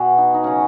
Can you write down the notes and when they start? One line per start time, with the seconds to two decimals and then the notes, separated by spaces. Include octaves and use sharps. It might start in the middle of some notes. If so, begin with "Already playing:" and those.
Already playing: B2 F#4 G#4
0.18 D#4
0.34 D#4
0.44 C#3 F#3 C#4